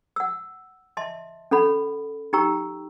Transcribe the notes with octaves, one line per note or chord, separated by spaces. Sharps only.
F#5 E6
D#5 E5 A5 C6
C#4 A4 F#5 B5
D#4 G4 G5 A#5 C#6 E6